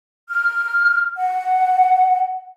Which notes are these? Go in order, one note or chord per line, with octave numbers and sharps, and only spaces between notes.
F6
F#5